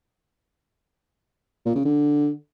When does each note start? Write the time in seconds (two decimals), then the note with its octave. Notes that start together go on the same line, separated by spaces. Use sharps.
1.66 A#2
1.75 C#3
1.85 D3